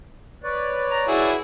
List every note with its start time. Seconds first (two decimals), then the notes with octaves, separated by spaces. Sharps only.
0.44 B4 C#5 D5
0.91 A#5
1.08 E4 F#4 G#4